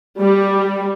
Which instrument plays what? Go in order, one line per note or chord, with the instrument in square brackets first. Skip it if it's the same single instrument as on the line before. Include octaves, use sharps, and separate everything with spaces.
[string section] G3